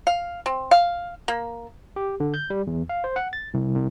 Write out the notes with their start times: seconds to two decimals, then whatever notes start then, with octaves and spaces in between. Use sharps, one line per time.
0.07 F5
0.46 C4
0.71 F5
1.28 A#3
1.96 G4
2.20 D3
2.34 G6
2.50 G3
2.67 E2
2.89 F5
3.04 C5
3.16 F#5
3.33 A6
3.54 C2
3.75 C2